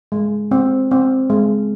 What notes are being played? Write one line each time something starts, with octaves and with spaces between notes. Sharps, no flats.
G#3
C4
C4
G#3